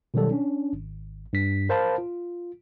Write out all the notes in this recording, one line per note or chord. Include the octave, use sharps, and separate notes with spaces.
B2 D#3 F#3 G3 A4
C#4 D4
G#1
G2 B6
A#4 C5 F5 A5 B5
F4